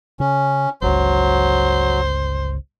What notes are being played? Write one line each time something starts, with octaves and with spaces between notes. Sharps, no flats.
C#3 C#4
G1 C#2 F#3 C5